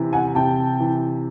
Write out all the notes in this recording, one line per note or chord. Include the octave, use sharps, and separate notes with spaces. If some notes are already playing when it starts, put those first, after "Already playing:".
Already playing: C3 E3
F#5 G#5
C3 G5 A5
E3